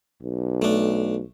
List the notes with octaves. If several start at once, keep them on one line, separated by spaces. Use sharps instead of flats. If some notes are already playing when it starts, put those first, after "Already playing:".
B1
A3 D4